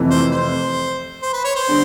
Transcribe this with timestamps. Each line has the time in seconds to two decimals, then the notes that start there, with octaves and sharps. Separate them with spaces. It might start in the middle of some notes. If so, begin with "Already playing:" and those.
Already playing: F2 C3 E3 A3
0.11 C5
0.32 C5
1.22 C5
1.33 B4
1.44 C#5
1.56 C5
1.68 D3 G3 B3 D4